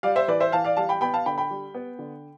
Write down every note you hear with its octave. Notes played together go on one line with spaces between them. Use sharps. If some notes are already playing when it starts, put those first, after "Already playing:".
G3 D5 F5
C5 E5
E3 B4 D5
C5 E5
E3 F5 A5
D5 F5
G3 F5 A5
G5 B5
B3 G5 B5
F5 A5
D3 G5 B5
G5 B5
G3
B3
D3